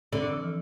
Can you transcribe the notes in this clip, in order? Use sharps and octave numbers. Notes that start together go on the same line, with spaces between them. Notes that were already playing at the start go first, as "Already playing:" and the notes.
D3 C4
D4
E3
F3